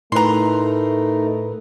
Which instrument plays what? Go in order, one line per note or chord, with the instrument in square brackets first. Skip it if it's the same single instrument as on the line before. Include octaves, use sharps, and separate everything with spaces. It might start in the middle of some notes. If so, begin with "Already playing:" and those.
[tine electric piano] A2 B4 [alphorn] A3 [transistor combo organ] D#4 A#4 [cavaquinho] A#5 C6